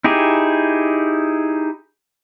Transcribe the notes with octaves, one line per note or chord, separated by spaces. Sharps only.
D#4 E4 G4 G#4